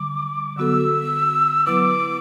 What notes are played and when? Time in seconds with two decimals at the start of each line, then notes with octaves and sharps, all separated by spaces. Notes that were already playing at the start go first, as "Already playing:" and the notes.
Already playing: D3 G3 D6
0.57 D3 F#3 B3 F#4 A4 E6
1.66 F#3 B3 E4 B4 D6